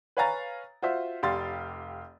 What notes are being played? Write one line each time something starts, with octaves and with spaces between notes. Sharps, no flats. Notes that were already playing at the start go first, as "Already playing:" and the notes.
B4 C#5 F5 G#5 A#5 A6
F4 F#4 C5 E5
F1 G4 F5 C6 A6